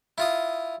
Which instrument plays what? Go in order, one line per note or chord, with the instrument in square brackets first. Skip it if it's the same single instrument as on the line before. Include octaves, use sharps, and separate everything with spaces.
[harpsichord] E4 F4 D#6